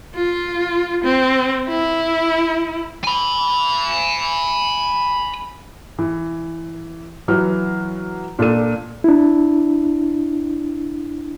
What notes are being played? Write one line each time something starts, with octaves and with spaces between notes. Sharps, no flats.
F4
C4
E4
G#5 B5
E3
E3 F#3 B4 F6
A#2 D4 A4 D#7
D4 E4